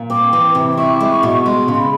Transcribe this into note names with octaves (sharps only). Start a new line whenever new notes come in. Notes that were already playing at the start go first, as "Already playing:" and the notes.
Already playing: A#2
C4 D6
E3
C3
D6
E4 C#6
D6
G#3
C#6
B2
C#6
G#3 C6
C#3
C6
B5